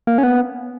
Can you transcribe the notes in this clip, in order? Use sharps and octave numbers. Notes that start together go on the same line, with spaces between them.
A#3
C#4
B3